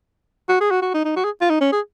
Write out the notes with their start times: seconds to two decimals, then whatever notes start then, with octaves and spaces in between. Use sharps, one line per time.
0.49 F#4
0.61 G#4
0.71 F#4
0.82 F#4
0.94 D#4
1.05 D#4
1.16 F#4
1.24 G#4
1.41 F4
1.50 D#4
1.61 C#4
1.73 G#4